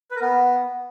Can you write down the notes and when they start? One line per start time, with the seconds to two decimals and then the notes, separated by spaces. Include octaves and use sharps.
0.11 B4
0.16 A#4
0.21 B3